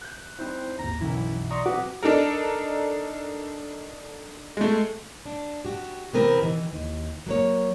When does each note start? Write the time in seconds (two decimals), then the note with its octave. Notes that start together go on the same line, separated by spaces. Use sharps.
0.01 F#6 G6
0.39 C4 D#4 E4 C5
0.79 G#1 D#2 A#5
1.00 B1 F#2 E3 E4
1.51 D5 A#5 C6 C#6 D#6 A#6
1.66 C4 F#4 B4 D6
2.03 D4 D#4 A4 A#4
4.57 G#3 A3
5.26 D4
5.65 F#4 G4
6.13 C3 E3 B3 C4 A#4 B4
6.41 D#3 E3
6.73 D#2
7.26 F#3 A#3 C#5